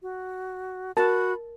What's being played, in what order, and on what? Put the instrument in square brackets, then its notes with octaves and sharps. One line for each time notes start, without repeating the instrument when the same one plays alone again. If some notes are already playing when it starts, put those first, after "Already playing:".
[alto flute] F#4
[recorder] F#4 [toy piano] A#4 [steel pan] A5 [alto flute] B5